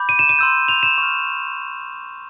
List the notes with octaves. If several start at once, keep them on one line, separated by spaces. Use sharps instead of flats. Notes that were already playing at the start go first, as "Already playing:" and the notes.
Already playing: B5 D6 G6
D#7
E7
D#7
C6 E6 G6
F7
E7
C#6 F6